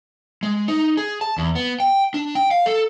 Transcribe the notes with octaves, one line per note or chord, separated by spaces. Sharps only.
G#3
D#4
G#4
A5
E2
B3
G5
D4
G5
F5
A4